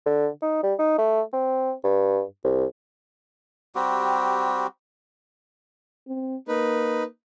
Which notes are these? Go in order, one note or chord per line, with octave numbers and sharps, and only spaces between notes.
D3
D#4
G3
D#4
A3
C4
G2
C2
G3 C4 F#4 G4
C4
A#3 D#4 B4